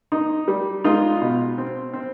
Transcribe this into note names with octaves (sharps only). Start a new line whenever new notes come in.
D#4
G3
G#3 D#4 F4
B2
C4
C4